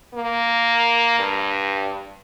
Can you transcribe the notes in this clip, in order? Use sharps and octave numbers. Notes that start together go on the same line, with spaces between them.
A#3
G2